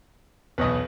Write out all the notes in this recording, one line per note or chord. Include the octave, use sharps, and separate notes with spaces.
B1 E2 B4 C#5 D#5